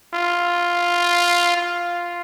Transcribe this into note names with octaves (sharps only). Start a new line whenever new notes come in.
F4
F4